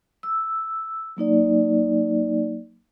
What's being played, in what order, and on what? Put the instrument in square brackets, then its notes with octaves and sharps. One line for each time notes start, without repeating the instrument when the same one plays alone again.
[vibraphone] E6
F#3 A#3 D#4 D5